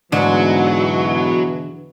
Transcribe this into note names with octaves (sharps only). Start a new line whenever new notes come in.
E2 G#2 B2 D3 E3 F#3